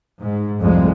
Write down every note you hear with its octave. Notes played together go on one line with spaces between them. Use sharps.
G#2
C2 F2 G#3